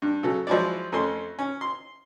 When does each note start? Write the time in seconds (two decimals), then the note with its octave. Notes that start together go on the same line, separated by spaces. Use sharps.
0.02 G2
0.23 C#3 F#3 A4
0.47 F3 F#3 G#3 E4 D5
0.92 F2 A3 C#4 C6
1.39 C#4
1.61 C6